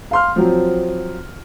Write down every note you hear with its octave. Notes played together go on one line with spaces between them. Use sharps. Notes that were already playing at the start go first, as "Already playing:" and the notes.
F5 C6 F6
F3 F#3 C4